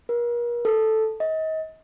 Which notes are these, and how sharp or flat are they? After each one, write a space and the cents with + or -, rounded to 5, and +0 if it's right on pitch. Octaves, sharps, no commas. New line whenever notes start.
A#4 +40
A4 +0
D#5 +30